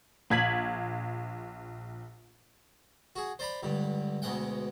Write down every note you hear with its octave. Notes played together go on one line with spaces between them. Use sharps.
A#1 G#6 B6 F#7
F#4 G#4
C5 D5 A#5 B5
C#2 G2 D3
D2 B2 G#3 F#5 G5